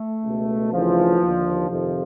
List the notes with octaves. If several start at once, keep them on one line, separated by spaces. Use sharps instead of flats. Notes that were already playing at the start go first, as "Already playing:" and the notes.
Already playing: A3
C#2 B2
D2 C#3 E3 F3
D#2 D3
F2 C3 D#3 F3